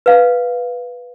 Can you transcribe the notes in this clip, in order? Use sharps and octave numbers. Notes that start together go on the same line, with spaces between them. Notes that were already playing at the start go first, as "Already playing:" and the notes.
B4 F5